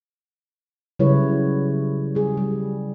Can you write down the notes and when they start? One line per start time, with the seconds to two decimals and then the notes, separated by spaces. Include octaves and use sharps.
0.99 C#3 F#3 G3 E4 B4 C#5
2.15 G3 G#4
2.37 G3